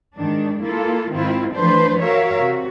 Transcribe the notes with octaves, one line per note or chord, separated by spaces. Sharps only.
G#2 D#3 D4
A#3 E4 F4 A4
G#2 D#3 C4 E4 F4
E3 F3 A3 D4 B4 C5
F#4 A#4 C#5 E5 F5
C3 F#4